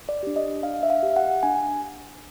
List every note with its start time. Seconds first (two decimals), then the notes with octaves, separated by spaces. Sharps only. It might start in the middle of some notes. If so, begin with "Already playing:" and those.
0.09 D5
0.23 D4 G4
0.36 D#5
0.63 D4 F5
0.83 E5
0.90 F5
1.03 G4
1.16 F#5
1.43 D4 G#5